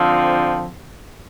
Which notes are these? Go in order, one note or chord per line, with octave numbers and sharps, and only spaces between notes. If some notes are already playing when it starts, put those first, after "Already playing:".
Already playing: D3 F3 C4